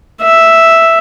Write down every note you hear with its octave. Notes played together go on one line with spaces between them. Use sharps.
E5